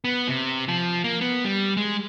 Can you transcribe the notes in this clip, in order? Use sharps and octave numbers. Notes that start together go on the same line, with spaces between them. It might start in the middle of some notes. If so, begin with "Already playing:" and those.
B3
C3
F3
A#3
B3
G3
G#3